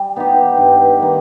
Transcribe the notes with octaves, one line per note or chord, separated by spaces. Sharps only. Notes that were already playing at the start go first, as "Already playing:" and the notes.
Already playing: G3
B3 D#4 G4
G2
D#3 A#3